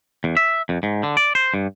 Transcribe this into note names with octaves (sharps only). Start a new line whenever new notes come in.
E2
E5
F2
G#2
D3
D5
C5
G2